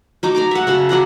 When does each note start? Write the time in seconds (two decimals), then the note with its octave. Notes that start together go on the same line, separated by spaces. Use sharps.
0.23 F#3 D#4 D6
0.35 D5 A#5 D6
0.51 E5 F#5
0.67 C#3 F#4 A5
0.89 F#3 D5 D#5 F#5